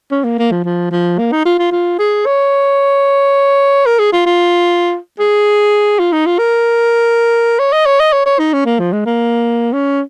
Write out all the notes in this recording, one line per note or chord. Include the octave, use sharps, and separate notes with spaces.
C#4
A#3
A#3
F3
F3
F3
A#3
D#4
F4
F4
F4
G#4
C#5
A#4
G#4
F4
F4
G#4
F4
D#4
F4
A#4
C#5
D#5
C#5
D#5
C#5
C#5
D#4
C#4
A#3
F3
G#3
A#3
C#4